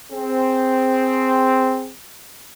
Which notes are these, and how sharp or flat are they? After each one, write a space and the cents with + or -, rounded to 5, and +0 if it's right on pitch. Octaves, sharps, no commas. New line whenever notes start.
C4 +0 G#4 +0